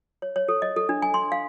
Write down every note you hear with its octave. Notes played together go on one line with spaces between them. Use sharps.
C#5
C#5
A4
D#5
A4
D4
G#5
C6
F5